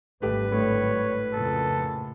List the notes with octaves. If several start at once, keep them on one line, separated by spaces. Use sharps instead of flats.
G#1 D3 G3 A3 G4 A4 B4
A2 C#5
F2 A#2 C#3 A4